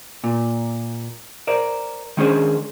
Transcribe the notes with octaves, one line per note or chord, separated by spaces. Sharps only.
A#2
A#4 C5 D5
D#3 G#3 C#4 D4 G#4 C5